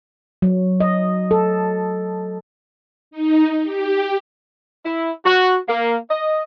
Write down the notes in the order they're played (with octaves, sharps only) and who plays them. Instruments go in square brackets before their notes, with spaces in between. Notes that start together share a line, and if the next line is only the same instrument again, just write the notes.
[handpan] F#3
D#5
A4
[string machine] D#4
G4
[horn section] E4
F#4
A#3
D#5